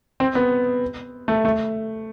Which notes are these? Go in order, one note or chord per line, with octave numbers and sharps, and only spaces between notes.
C4
B3
A3
A3